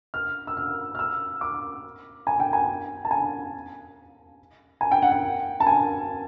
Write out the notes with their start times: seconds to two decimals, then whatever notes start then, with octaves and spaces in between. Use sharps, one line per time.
0.14 F6
0.47 E6
0.57 F6
0.95 F6
0.99 E6
1.41 D6
2.27 G#5
2.40 G5
2.53 G#5
3.05 A5
3.11 G#5
4.81 G#5
4.91 G5
5.02 F#5
5.12 G5
5.60 A5
5.67 G#5